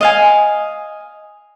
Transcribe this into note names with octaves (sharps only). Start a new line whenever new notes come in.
D#5 F5 G#5